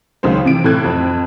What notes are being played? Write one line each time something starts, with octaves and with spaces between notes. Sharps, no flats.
C#2 D#3 F#3 C#4 C5
C3 E3 D7
A2 C3 A4 F#6 G#6
F2 C4